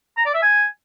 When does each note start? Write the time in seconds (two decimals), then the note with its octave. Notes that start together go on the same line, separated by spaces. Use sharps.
0.17 A#5
0.26 D5
0.34 E5
0.42 G#5